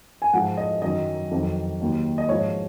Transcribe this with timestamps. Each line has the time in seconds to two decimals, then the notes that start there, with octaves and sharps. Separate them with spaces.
0.22 G#5
0.33 G#2 F3 F#5
0.57 D#5
0.82 F#2 D#3 F#3 D#5
1.31 F2 D#3 F#3
1.80 D#2 D#3 F#3
2.18 D#5
2.29 G#2 F3 C#5